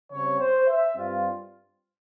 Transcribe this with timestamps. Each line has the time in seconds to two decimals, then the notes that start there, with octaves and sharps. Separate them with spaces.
0.11 C#3 G3 C4 C#5
0.39 C5
0.68 E5
0.96 G2 G3 C4 F4